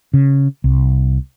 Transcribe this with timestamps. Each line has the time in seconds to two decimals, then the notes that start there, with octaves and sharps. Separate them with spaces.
0.14 C#3
0.64 C2